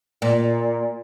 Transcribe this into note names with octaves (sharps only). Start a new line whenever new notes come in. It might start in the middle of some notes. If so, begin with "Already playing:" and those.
A#2